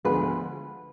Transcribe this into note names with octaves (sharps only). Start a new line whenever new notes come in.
D2 D3 F3 G#3 B3 B4